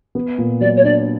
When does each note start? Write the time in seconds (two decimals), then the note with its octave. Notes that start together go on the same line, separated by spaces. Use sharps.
0.15 B3
0.38 A#2
0.61 F#3 D5
0.76 C#5
0.84 D4 D5